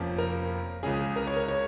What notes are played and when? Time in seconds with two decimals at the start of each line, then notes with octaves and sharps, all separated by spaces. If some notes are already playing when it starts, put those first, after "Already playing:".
Already playing: F1 F2 F3 A#3 C#4
0.18 A#4
0.83 C#2 C#3 G#3 C#4 G#4
1.16 A#4
1.27 C#5
1.36 A#4
1.48 C#5